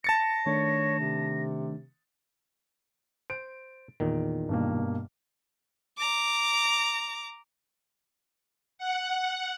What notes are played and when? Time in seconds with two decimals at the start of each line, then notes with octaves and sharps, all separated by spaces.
0.04 A5 A6 A#6 C#7
0.46 D#3 A3 D4 C#5
0.99 C3
3.30 C5 D7
4.00 E2 A#2 D#3
4.49 G2 B2 A#3
5.98 A#5 D6
8.78 F#5